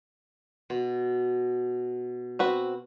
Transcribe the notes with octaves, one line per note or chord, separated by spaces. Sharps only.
B2
C4 F#4 B4